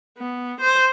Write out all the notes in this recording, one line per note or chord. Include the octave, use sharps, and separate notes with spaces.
B3
C5